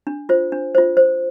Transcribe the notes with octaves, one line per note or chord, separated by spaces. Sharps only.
D4
F4 C5
D4
F4 C5
C5